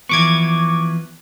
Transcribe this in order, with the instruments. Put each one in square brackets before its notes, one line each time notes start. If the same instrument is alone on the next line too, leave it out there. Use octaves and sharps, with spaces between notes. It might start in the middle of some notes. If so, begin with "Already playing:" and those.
[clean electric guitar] E3 F3 B3 [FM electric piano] C#6 D6 G#6